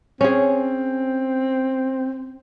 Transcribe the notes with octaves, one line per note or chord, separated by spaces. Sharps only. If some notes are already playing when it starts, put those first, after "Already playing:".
C4 C#4 G#4